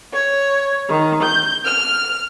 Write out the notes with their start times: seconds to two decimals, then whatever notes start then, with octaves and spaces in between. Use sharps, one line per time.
0.12 C#5
0.88 D#3
1.23 G6
1.64 F6